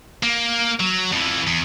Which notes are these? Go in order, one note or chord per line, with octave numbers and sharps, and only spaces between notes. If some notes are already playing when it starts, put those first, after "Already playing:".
A#3
F#3
F2 E3
E2